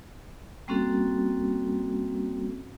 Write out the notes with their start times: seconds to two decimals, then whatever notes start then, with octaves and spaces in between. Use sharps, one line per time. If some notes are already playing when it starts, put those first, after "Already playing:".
0.68 G3 A#3 C4 C#4 F#4 A4